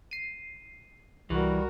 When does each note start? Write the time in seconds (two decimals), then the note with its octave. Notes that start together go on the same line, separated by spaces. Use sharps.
0.11 C7 D#7
1.30 C2 E3 G3 F#4 A#4